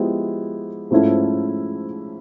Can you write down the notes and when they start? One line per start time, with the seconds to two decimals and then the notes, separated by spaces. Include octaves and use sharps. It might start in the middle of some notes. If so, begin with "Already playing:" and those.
Already playing: F3 G#3 B3 E4 G4
0.91 G#2 F3 A3 C#4 E4